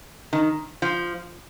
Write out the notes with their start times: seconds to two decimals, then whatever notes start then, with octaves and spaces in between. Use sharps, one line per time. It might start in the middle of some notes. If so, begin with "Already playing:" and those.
0.33 D#3
0.82 F3